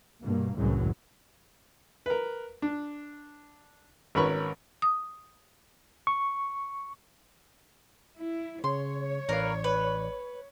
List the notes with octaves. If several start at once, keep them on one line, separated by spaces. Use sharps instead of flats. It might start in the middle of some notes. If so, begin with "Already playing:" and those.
G2 B2 A#3
C2 F#2 A2 E3 F#3 G#3
A#4 B4
D4
G#1 C#4 A#4 B4 B5 C#6
D#6
C#6
E4
C#3 C#5 C6
A1 A#4 B4 D5 F5
B4